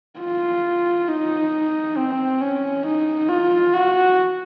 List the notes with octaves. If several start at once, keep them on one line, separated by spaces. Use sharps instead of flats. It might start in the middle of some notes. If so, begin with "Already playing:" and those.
F4
D#4
C4
C#4
D#4
F4
F#4